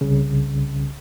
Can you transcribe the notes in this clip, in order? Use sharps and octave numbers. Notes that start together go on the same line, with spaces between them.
C2 C#3